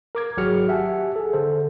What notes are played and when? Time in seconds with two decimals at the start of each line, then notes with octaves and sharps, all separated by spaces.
0.15 A#4 D6 G#6
0.37 G#1 F#3 F#4 G#4 F6 C#7
0.68 G4 E5 F#5 G#5 A5
1.16 G#4 A4
1.33 D3 A4 C5